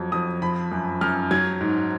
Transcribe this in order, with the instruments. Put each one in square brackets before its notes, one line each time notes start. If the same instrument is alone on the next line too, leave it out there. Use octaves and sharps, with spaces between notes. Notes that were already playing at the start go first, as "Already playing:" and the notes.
Already playing: [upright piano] F2 F#3 G#6
F2 D#6
F3 B5
F#2
F#2 F6
F#3 G#6
G#2